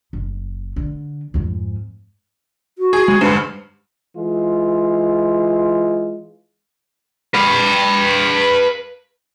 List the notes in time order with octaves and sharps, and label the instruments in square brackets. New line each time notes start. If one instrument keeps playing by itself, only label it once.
[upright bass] F#1
D3
F2 G#2
[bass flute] F#4
[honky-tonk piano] G#4
[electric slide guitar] G#3
[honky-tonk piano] F1 G2 [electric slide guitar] D3 G#3 C5 [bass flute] B4
[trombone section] E3 G#3 F4
[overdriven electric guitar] B4 F5